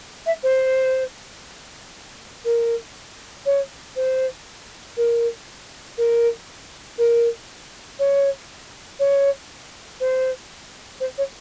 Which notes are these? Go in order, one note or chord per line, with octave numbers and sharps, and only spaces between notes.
E5
C5
A#4
C#5
C5
A#4
A#4
A#4
C#5
C#5
C5
C5
C#5